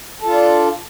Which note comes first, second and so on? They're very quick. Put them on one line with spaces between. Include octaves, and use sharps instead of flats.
A4 F4 D4